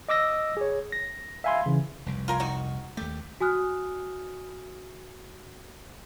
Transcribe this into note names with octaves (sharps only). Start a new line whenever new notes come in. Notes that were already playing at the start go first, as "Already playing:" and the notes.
D#5 D6 E6 A#6
G#4 C#5
A#6
E5 F5 G#5 B5 C6
C#3 E3
F1 C2
F4 A#4 G#5
D#3 D#4 F#4
D#2 A3 G4
F#4 G#5 D#6 F6 F#6